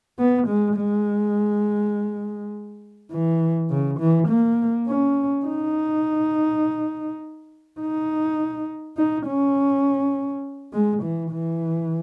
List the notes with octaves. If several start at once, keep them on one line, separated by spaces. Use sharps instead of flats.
B3
G#3
G#3
E3
C#3
E3
A#3
C#4
D#4
D#4
D#4
C#4
G#3
E3
E3